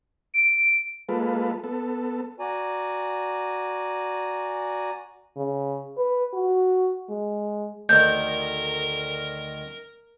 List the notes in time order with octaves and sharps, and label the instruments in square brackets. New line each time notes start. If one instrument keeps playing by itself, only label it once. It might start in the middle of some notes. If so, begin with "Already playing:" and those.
[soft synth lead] D7
[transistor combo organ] G#3 A#3 F4 A4 B4
B3 A4
[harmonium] F#4 D5 G#5 A#5
[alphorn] C#3
B4
F#4
G#3
[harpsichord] D2 D#3 [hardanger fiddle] A#4 [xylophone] G6